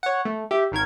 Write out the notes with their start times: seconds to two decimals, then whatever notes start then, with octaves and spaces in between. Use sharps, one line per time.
0.03 C#5 F#5
0.25 A3
0.51 G4 E5
0.72 G#1 D#3 A#4 G#6